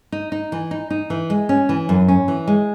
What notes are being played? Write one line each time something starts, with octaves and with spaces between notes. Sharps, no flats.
D#4
D#4
E3
D#4
D#4
E3
G#3
C#4
E3
F#2
C#4
E3
G#3